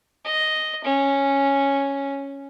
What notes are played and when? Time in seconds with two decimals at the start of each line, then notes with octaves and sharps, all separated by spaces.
0.25 D#5
0.84 C#4